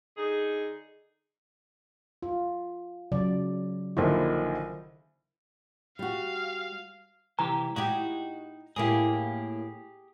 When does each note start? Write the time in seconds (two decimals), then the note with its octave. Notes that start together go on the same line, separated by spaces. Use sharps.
0.17 D3 D#4 G#4
2.23 F4
3.12 C#3 F#3 D5
3.97 A#1 D3 D#3 E4 A#4 C5
5.99 G3 F#4 F5
7.39 C2 E3 G4 A#5
7.76 D#4 E4 F#4 G4
8.76 A2 A#3 E4 G4 G#4